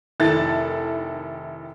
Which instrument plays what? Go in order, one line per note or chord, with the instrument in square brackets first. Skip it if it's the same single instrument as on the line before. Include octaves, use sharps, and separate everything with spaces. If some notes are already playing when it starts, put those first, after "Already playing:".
[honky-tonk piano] F1 D#3 E4 A4 A6